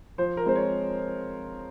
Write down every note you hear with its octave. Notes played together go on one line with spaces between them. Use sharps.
F3 C5
A#4
G#3 C4 C5
C#5